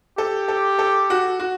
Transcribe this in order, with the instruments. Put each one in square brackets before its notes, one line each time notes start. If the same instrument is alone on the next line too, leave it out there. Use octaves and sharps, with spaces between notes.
[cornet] G4 [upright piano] A4
[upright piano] A4
A4
F#4
F#4